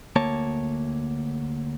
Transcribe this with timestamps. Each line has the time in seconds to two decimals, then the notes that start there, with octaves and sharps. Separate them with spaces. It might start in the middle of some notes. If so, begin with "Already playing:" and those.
0.16 D2 A#3 C#5 A5